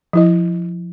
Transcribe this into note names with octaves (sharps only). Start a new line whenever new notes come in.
F3 E4 D#5